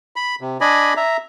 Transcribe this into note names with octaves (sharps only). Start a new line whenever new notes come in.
B5
C3
D4 D5 D#5 G#5 B5
E5 A#5